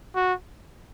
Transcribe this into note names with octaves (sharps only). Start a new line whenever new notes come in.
F#4